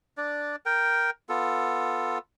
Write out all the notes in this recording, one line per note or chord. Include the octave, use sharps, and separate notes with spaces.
D4 D5
A#4 G5
B3 F4 A4